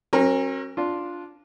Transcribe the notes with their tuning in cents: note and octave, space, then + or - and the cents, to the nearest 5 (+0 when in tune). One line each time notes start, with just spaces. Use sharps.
F#3 +20 C#4 -45 A#4 +5
D4 -5 F4 +0